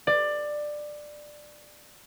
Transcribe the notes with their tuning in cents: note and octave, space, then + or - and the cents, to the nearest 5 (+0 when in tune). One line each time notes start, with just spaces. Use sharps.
D5 +15